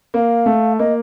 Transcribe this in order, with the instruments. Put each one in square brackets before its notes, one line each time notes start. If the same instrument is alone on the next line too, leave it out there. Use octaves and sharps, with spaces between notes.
[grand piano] A#3 [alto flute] F5
[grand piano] A3
[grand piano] A#3 [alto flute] D#5